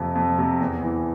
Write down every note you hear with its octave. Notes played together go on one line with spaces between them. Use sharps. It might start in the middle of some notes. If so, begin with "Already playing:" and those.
Already playing: F2 C3
F2
C3
E2
E3